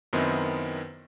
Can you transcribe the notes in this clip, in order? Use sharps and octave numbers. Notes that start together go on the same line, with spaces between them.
F#2 D#3 B3 C4 D#4 E4